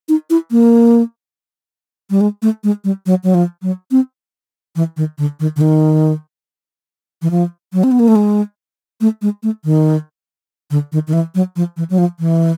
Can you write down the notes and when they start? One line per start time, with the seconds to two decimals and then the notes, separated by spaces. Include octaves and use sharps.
0.09 D#4
0.30 E4
0.51 A#3
2.10 G3
2.21 G#3
2.42 A3
2.64 G#3
2.84 G3
3.06 F#3
3.24 F#3
3.34 F3
3.62 F#3
3.91 C4
4.76 E3
4.97 D#3
5.18 D3
5.40 D#3
5.56 D3
5.61 D#3
7.22 E3
7.31 F3
7.73 F#3
7.84 C4
7.91 B3
7.99 A#3
8.08 A3
8.15 G#3
9.01 A3
9.22 G#3
9.43 A3
9.64 D#3
10.71 D3
10.92 D#3
11.07 D#3
11.13 E3
11.35 F#3
11.56 F3
11.77 E3
11.90 F#3
11.98 F3
12.19 E3